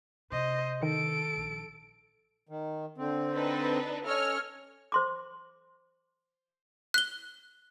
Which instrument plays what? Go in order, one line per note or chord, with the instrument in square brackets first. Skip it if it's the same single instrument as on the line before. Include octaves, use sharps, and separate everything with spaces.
[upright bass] C3 [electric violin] C5 D#5
[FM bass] D#3 [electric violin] A4 D7
[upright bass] A#1
[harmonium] D#3
D3 C4
[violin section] D4 D#4 B4
[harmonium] C#4 A4 [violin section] C#5 D#5 F6
[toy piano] C5 C6 D6
[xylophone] F#6 G7